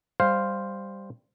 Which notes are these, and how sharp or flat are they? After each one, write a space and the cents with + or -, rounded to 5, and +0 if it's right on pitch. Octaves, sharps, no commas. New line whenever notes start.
G3 +5 C5 +0 F5 +0